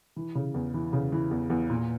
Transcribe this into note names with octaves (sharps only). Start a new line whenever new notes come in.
E3
C#3
E2
E3
C#3
E3
E2
E2
A#2